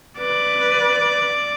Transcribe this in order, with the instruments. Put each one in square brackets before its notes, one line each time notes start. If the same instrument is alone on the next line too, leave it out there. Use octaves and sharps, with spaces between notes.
[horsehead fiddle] B4 [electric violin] D5